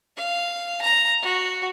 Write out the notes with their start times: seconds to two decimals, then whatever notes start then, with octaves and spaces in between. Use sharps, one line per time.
0.17 F5
0.82 A#5
1.22 F#4